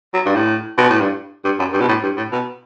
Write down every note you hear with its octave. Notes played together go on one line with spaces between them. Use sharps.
F#3
G2
A2
B2
A2
G2
G2
F#2
G2
B2
A2
G2
A2
B2